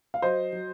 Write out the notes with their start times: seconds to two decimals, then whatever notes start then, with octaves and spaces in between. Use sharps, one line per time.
0.14 F5
0.22 F#3 C5 D#5
0.53 F#3